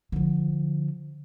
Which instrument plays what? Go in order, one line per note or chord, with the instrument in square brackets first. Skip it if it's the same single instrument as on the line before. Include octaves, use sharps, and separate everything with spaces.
[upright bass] D3 F3